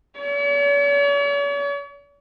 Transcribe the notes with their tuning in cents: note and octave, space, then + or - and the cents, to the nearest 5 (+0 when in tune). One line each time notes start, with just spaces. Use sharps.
C#5 +45